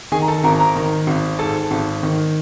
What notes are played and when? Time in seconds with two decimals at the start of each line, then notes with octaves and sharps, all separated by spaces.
0.12 D#3 G#4 G#5
0.22 A#5
0.28 A4 A5
0.43 G#1 A#4 A#5
0.60 A#4 A#5
0.76 D#3
1.07 G#1
1.39 G#2 A4 A5
1.71 G#1
2.03 D#3